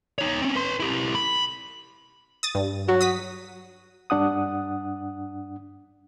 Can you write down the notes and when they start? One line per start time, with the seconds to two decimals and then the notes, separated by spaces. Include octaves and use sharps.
0.19 D#4 C#5
0.42 C4 C#4
0.55 B4 C6
0.80 E4 G4
1.15 B5
2.43 D#6 A6
2.55 G2
2.89 F#3 F#4
3.01 D#6 B6
4.10 G2 D4 F#5 D#6